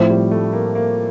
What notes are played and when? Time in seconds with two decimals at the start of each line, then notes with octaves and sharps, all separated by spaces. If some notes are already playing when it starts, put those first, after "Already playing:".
Already playing: A2 F3 C4
0.10 G3
0.31 A3
0.53 A#3
0.75 A#3